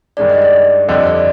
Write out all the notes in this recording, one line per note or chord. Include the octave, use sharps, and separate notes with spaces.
G2 D#3 G#3 D4 D5
D#5
D5
F2 D3 G3 D#5
D5